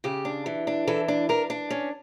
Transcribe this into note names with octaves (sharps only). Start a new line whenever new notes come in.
C#3 G4
D4
E3
D4
E3 A4
D4
D4 A#4
D4
C#4